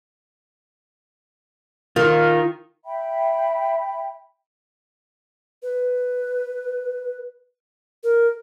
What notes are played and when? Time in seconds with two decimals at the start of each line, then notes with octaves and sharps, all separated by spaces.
1.96 D#3 F4
2.85 E5 G5 B5
5.63 B4
8.03 A#4